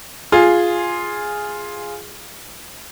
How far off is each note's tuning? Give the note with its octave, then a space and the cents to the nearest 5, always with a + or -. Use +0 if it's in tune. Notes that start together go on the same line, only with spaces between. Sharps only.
F4 +0 G#4 +0